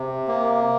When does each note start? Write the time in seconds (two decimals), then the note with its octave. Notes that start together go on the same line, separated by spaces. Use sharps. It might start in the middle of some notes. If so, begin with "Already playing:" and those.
Already playing: C3
0.28 A#3